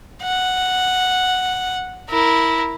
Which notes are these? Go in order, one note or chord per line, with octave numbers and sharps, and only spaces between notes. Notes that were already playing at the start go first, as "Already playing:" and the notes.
F#5
E4 A#4